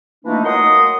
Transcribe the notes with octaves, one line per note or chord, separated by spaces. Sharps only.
E3 F3 A3 A#3 D4 D#4
F#3 A#3 D#5 F#5 C6 D#6